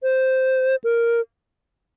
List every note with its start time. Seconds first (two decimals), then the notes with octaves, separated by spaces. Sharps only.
0.03 C5
0.84 A#4